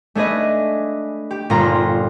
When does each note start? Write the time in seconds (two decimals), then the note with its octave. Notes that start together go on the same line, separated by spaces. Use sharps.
0.15 A3 D4 G#4 B4 D#5
1.31 G4
1.50 G1 A#2 G3 F4 A#5